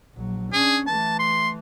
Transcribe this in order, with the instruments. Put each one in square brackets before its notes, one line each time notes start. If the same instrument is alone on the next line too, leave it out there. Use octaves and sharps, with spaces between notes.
[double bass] A#1 F#3
[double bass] C#4 D4 [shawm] G#4
[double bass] E3 A3 [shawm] A5
[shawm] C6